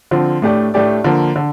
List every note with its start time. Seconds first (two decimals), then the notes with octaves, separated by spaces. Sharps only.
0.11 D3 F3 C4 F4
0.42 A2 A3 D4 G4 D5
0.74 A2 A3 D4 G4 D5
1.04 D3 F3 A#3
1.36 D3